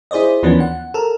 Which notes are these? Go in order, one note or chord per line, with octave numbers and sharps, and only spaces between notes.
E4 G#4 C5 D5 D#5
D#2 E3 F3 B3 C#4 D4
F#5
A4 A#4